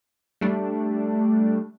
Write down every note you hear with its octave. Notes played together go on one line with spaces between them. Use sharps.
G3 A3 D4